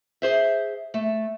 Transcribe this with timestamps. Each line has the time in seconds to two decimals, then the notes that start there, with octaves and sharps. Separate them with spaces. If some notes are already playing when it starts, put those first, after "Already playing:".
0.22 G#4 C5 E5
0.94 A3